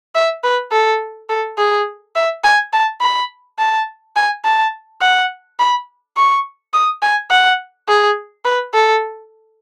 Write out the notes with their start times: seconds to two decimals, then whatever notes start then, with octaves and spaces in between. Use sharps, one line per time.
0.15 E5
0.44 B4
0.72 A4
1.29 A4
1.58 G#4
2.16 E5
2.44 G#5
2.73 A5
3.01 B5
3.59 A5
4.16 G#5
4.44 A5
5.02 F#5
5.59 B5
6.17 C#6
6.74 D#6
7.02 G#5
7.31 F#5
7.89 G#4
8.45 B4
8.74 A4